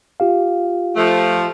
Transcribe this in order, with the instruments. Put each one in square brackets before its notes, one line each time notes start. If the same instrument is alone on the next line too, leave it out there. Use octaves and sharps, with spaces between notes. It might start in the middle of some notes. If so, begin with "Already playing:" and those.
[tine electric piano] F4 G4 F5
[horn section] F3 A3